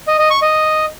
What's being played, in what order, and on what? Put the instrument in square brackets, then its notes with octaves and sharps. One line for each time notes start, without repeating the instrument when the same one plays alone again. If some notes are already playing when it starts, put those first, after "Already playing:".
[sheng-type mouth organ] D#5
D#5
C#6
D#5